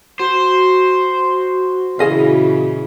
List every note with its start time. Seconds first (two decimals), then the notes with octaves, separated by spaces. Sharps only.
0.19 F#4 C5
1.99 A#2 C#3 E3 G#4 D#5 F5